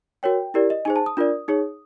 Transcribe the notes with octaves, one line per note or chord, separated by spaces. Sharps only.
F#4 A#4 C#5 G5
E4 G4 A#4 D5
D#5
D#4 G#4 C5 G#5
A5
D#6
D4 F4 A#4 D5
D#4 G#4 C#5